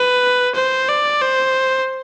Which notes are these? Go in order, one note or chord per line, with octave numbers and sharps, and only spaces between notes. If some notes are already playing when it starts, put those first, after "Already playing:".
Already playing: B4
C5
D5
C5